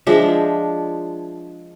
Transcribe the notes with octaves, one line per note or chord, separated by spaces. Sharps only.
F3 G#3 D4 E5